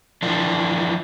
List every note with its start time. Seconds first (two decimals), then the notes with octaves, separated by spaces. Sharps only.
0.23 E3 F3 D4